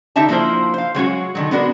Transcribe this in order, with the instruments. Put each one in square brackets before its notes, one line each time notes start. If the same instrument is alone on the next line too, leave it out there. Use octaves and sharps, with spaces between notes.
[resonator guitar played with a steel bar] D3 D#4 G4 E5 A5 A#5
F3 A#3 D4 E4 C5
C5 F5
F#3 G#3 C#4 F#4
D3 D#3 F#3
G#3 B3 D4 F#4 A#4